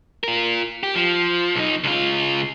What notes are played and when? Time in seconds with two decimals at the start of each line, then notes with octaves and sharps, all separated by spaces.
0.24 F4 A#4
0.83 G4
0.95 F3
1.55 B1 D#4
1.84 C#2 F4